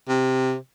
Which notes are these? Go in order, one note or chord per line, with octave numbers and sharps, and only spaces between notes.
C3